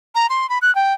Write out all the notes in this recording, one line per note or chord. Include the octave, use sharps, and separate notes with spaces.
A#5
C6
B5
F#6
G5